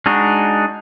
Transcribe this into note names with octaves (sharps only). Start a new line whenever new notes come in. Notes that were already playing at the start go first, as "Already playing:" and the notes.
G#3 D4 D#4 F#4